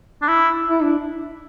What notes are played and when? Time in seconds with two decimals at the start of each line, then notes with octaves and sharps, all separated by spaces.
0.22 D4
0.28 E4
0.68 E4
0.83 D4